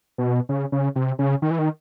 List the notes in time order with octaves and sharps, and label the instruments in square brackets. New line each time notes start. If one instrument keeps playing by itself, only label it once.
[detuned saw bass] B2
C#3
C#3
C3
C#3
D#3
E3
D#3